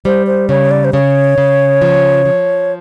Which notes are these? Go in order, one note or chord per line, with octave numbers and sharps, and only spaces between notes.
G3 C5
C5
C#3 C#5
D5
C5
C#3 C#5
C#3
F3
F3